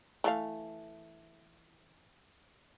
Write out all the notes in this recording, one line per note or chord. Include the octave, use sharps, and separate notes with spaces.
E3 A3 F5